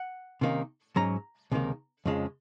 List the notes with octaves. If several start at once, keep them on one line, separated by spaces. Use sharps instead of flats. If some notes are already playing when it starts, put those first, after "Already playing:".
Already playing: F#5
C3 D#3 A#3 C#4
G#2 F#3 C#4 A#5
C#2 C3 D#3 A#3
F2 C#3 F3 G#3